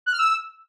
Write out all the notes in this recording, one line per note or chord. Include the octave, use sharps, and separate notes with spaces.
F#6
F6
E6